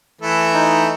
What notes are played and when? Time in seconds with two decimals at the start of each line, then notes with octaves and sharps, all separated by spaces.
0.22 E3 A3 B4
0.54 D#4